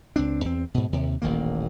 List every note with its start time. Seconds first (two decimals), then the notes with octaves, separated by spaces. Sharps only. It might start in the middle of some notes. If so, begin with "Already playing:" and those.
0.16 C#2 C4 D4
0.44 E2 C4
0.74 G#2 B2
0.92 D#2 C3
1.22 D#1 A1 D#3 A#3